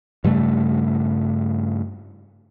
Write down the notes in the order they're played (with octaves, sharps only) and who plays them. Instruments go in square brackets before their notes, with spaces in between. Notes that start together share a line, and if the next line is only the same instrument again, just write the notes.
[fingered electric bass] G2 C#3 G3 A3